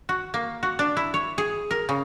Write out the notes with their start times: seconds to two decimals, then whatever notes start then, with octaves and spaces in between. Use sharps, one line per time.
0.09 F#4
0.34 A#3
0.63 F#4
0.79 D4
0.97 E4
1.14 C#5
1.38 G#4
1.71 A#4
1.89 C#3